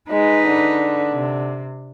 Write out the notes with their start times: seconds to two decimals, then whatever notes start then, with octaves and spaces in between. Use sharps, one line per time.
0.10 G#3 D#4 B4
0.47 D3
1.13 C3